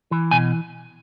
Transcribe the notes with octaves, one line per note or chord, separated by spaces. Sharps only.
E3
B2 G#5